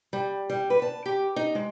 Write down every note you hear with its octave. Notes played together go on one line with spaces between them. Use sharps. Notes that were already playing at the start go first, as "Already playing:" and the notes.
G3
G3
B4
A5
G4
D#4
G#3